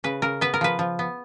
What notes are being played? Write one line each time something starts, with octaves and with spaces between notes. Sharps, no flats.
C#3 B4
C#3 A#4
B3 B4
A#4
F3 B4
F3
B3